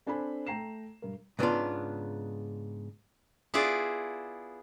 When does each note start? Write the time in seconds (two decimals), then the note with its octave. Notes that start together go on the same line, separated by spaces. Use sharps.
0.06 C4 D4 A4 C5 G#5 B5
0.47 A3 G5 A#5 C7 E7
1.02 G2 A#4
1.39 G#2 C#3 B3 C#4 D4 F4
3.54 B3 E4 F4 G#4 D5